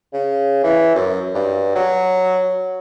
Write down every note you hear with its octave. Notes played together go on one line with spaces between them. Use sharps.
C#3
E3
F#2
G2
F#3